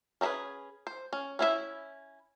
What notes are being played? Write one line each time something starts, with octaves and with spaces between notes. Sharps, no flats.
C#4 D#4 E4 G#4 B4
C5
C#4
C#4 E4 F4 E5